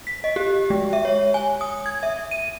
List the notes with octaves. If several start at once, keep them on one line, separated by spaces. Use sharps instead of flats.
B6
D#5
G4
G#3
E5
C#5
G#5
D#6
G#6
E5
D#7